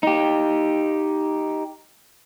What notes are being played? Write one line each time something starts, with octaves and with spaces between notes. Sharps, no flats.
D#4 G4